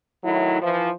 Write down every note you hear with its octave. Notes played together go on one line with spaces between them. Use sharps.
A2 D#3 F#3 E4
E3 F3